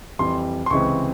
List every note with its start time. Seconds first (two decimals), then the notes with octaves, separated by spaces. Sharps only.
0.19 F2 E3 G3 C6
0.66 C6
0.70 C#2 C3 E3 G#3 C4 C#6